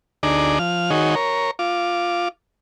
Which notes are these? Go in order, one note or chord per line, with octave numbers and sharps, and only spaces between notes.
D2 D4 D#4 G#4 D5 A#5
F3 F6
D#3 D#4 F#4 G#4 C#5
A#4 C#5
F4 D6